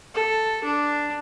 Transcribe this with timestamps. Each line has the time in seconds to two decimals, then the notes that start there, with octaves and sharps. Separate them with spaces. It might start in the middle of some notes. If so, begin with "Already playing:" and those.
0.15 A4
0.64 D4